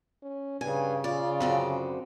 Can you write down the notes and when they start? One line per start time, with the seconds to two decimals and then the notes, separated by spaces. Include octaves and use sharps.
0.22 C#4
0.61 G2 C#3 G#5
1.04 F4 D5
1.40 F#2 D3 C4